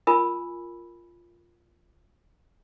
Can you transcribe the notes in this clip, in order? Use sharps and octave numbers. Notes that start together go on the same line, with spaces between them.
F4 A#4 G#5 B5 D#6 E6